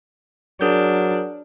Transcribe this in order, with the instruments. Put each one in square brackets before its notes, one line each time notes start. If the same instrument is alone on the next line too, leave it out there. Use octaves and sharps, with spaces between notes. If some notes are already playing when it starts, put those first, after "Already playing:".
[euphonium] F#3 [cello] D4 [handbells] G#4 A#4 G6